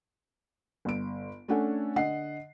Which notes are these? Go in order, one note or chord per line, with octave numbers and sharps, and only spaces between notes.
G1 D7
A3 C#4 D4 A4 F#5 G#5
D3 D#5 F#5 C7